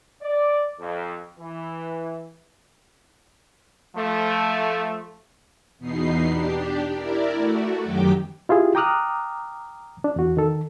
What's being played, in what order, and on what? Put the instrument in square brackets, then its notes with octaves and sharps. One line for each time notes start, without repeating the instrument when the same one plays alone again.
[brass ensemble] D5
F2
E3
[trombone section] F3 A3
[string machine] E2 B2 B3 D#4 C7
D4 G4
E4 A#4 D5
A3 F#4
F#2 D#3 F#3 G4 G5 D6
[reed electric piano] E4 F4 G4 G#4
G5 A#5 D6 D#6 F6 F#6
D4
E2 F#4
D#3 A4